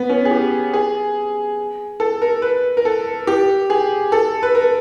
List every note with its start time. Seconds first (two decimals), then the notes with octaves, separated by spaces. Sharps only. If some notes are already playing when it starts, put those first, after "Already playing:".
Already playing: B3
0.10 C#4
0.25 G#4
0.31 G4
0.74 G#4
2.00 A4
2.22 A#4
2.42 B4
2.77 A#4
2.85 A4
3.27 G4
3.70 G#4
4.12 A4
4.43 B4
4.55 A#4